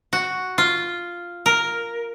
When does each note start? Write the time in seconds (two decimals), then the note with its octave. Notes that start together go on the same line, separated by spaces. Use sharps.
0.13 F#4
0.58 F4
1.46 A#4